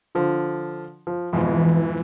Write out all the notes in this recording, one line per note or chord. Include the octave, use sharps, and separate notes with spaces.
D3 F3
F3
F2 G#2 B2 E3